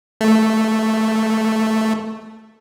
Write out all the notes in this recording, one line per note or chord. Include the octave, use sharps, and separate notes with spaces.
A3